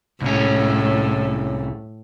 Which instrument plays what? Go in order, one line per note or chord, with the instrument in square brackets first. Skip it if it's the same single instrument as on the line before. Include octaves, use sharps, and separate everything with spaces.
[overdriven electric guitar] C2 C#4 [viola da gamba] A2